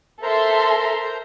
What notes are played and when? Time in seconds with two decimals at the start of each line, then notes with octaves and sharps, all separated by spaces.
0.23 A4 A#4 C5 E5 A#5 C6